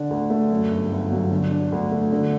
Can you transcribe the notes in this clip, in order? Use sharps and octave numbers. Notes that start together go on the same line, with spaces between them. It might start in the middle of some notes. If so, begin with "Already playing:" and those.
Already playing: D3 D4
D2
A3
F#2
G1
G1
F#3
D3
D4
D2
A3
D3